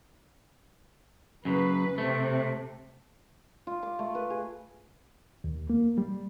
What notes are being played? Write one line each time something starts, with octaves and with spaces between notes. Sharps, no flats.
F#2 C#3 B4
C3 A3
F4
D6
A3
B4
G#4
D#2
A#3
G3